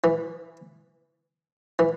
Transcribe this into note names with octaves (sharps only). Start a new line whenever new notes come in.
E3
E3